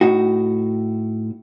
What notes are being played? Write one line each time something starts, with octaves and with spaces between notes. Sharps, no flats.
A2 D#4 F#4